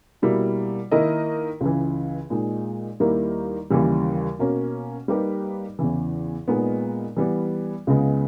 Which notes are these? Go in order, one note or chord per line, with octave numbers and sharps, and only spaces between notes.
B2 G3 A#3 E4
D#3 A#3 E4 A#4 D#5
C#2 C#3 E3
A#2 G#3 D#4
D#2 D#3 G3 A#3 E4
D#2 C#3 E3 G3
B2 A#3 C#4
G3 A#3 D#4 G4 B4
E2 C#3 E3
A#2 G#3 B3 D#4 A#4
E3 G3 B3
C#2 C#3 G#3 B3